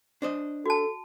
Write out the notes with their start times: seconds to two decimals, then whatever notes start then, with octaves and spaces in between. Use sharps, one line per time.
0.22 D4 C5 D#5
0.66 F#4 A4 A5